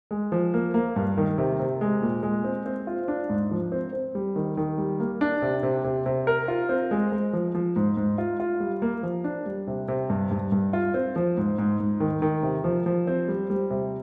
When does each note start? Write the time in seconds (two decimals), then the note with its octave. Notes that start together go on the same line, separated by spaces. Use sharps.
0.11 G#3
0.32 F3
0.54 A#3
0.74 A#3
0.96 G2
1.18 D#3
1.38 C3
1.59 C3
1.81 G#3
2.02 A#2
2.23 G#3
2.44 C4
2.66 C4
2.87 F4
3.08 D4
3.30 G#2
3.51 F3
3.72 C4
3.93 C4
4.15 G3
4.36 D#3
4.57 D#3
4.78 G3
5.00 A#3
5.21 D4
5.42 C3
5.63 C3
5.84 C3
6.06 C3
6.27 A#4
6.48 F4
6.69 C4
6.91 G#3
7.12 G#3
7.33 F3
7.55 F3
7.76 G#2
7.97 G#2
8.18 F4
8.40 F4
8.60 G3
8.82 A#3
9.03 F3
9.24 D4
9.46 G3
9.67 C3
9.88 C3
10.10 G2
10.31 G2
10.52 G2
10.73 F4
10.94 C4
11.16 F3
11.37 G#2
11.58 G#2
11.80 G#2
12.00 D#3
12.22 D#3
12.43 C3
12.64 F3
12.86 F3
13.07 C4
13.28 G3
13.50 G3
13.70 C3